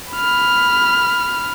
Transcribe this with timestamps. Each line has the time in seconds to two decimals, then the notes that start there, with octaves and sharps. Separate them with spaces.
0.13 B5 F6